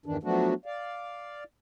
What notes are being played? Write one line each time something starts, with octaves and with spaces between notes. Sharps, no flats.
E2 G2 D#3 E3 D4
F3 F#3 A3 B3 D4 F#4
D5 F5